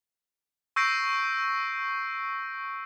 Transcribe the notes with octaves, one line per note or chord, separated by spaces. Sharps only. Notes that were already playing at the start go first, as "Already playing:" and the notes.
C#6 E6 G6 A#6 C7 D7